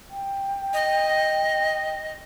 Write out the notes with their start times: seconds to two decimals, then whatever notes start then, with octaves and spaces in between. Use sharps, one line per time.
0.10 G5
0.73 D#5